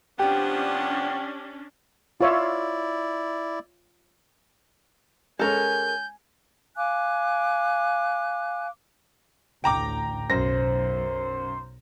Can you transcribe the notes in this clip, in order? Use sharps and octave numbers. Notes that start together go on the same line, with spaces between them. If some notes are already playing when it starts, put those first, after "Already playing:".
C3 F3 B3 C#4 D4 G4 G5
E4 F4 C#5 D5 E5
G#3 C#4 A4 A#4 G#5 G6
F5 G#5 D6 F#6
A1 D2 G5 A#5 D6
B1 F#2 C5 A#6